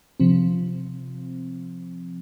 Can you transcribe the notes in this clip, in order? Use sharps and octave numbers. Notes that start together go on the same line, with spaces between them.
C3 F3 C4